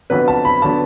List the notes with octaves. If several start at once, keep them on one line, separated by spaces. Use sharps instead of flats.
F2 D3 F#3 B3 B4
A5
B5
D3 F#3 B3 A5